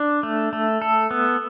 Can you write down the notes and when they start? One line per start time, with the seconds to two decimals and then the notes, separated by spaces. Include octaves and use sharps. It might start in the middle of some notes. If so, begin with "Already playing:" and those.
Already playing: D4
0.23 A3
0.53 A3
0.82 A4
1.11 B3